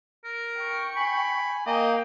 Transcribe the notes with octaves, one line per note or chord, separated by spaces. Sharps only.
A#4
G5 C#6
G#5 B5
A#3 D#5 G5